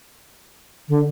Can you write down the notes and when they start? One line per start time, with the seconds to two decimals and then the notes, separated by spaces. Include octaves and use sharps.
0.89 D3